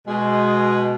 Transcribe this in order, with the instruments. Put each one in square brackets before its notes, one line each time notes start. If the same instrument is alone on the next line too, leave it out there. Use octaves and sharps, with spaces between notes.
[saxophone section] B2 G#3